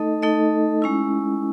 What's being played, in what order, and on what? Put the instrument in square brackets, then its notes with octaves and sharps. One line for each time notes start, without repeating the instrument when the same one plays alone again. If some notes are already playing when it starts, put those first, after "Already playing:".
Already playing: [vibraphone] A3 D#4 A4 D#5
A3 D#4 A4 D#5
G#3 C#4 E4